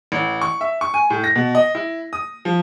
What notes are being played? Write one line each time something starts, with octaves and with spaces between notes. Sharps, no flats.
A1
C#6
E5
C#6
G#5
A2
A#6
B2
D#5
E4
D#6
F3